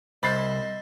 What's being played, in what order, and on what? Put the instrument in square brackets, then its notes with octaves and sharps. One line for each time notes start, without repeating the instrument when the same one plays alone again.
[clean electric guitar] C2 [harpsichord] C5 E5 [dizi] D#5 [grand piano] B5 A6 C7